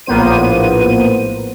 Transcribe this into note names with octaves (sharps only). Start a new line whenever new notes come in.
A#1 A2 A#3 B3 C5 D#7